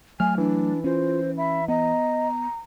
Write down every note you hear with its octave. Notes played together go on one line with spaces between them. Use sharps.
F#3 A3 G#5 F6
E3 D4
C#4 F4 C5
E5 B5
B3 D#5 A#5